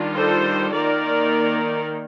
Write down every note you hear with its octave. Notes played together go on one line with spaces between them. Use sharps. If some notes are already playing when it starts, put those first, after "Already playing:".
Already playing: D#3 G3 D4 F4
A4 C5
D#3 A#3 D#4 A#4 D5